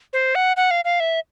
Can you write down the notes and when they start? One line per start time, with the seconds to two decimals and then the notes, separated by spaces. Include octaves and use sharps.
0.13 C5
0.35 F#5
0.57 F#5
0.71 F5
0.85 F5
1.00 E5